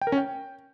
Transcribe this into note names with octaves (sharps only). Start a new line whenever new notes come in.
G5
A#4
C#4
G5